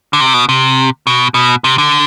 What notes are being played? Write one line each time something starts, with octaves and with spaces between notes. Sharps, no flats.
D3
C3
B2
C3
B2
B2
C3
D3